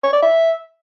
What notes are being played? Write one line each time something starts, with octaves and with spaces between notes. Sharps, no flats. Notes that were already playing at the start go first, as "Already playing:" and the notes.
C#5
D5
E5